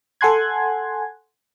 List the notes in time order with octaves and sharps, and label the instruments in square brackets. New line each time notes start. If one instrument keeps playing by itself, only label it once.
[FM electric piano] A4 F#5 G#5 C6 F#6 G#6